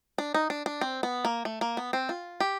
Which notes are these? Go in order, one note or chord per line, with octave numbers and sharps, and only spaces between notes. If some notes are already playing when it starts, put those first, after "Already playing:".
D4
D#4
D4
D4
C4
B3
A#3
A3
A#3
B3
C4
F4
G4